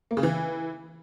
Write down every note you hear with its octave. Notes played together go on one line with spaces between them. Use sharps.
A#3
C#3
E3